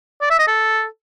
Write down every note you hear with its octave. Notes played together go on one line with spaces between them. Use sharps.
D5
E5
D#5
A4